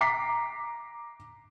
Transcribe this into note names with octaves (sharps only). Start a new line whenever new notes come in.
A#5 D6 B6 C7